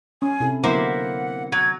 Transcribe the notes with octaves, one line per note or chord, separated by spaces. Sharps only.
C#4 G#5
C3 E4 A4
D3 F#3 A#3 B3 E4 C5 F#5
F#3 F#5 G#6